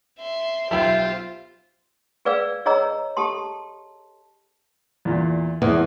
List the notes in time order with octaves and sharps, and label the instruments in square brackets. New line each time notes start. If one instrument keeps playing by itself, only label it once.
[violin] E5 C6
[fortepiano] B1 G5 [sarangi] F4 [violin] G4 C5 [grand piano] E5
[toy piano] G#4 B4 D5 F5 E6
G#4 C#5 D#5 A#5 E6
G4 A4 A5 C6
[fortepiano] E2 A#2
[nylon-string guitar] E2 [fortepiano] A2 G#3